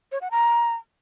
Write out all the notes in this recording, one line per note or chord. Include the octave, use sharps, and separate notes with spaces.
C#5
F#5
A#5